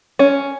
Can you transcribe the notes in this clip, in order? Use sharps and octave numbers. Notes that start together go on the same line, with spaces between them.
C#4